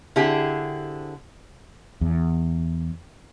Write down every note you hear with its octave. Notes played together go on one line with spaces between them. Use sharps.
D3 C4 E4 G4 G#4
E2